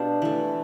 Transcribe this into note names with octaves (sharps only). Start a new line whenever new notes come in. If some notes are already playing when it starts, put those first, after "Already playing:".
Already playing: B2 D4 F4 G4
E3 A3